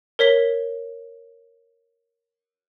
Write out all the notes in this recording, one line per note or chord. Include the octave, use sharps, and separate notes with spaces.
A#4 C#5 B6 G7